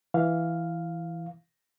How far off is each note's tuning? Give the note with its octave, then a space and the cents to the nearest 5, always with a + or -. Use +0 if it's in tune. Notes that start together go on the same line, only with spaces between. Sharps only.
E3 +5 F5 +0